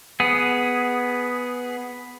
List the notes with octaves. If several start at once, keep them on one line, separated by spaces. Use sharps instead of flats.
B3 G#4